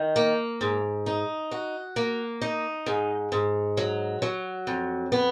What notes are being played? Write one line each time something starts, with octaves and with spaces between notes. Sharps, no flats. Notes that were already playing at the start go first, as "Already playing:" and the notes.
Already playing: D#3
A#3
G#2
D#4
F#4
A#3
D#4
G#2
G#2
F#3
F#3
F2
B3